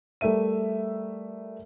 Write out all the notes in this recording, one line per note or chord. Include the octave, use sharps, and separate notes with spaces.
G3 A3 A#4 E5 D#7